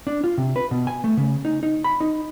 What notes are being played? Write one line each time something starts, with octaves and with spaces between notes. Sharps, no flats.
D4
F4
C3
B4
B2
G#5
A3
C#3
D#4
D#4
B5
D#4